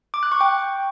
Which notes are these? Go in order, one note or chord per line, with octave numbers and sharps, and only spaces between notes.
D6
F#6
C#6
G5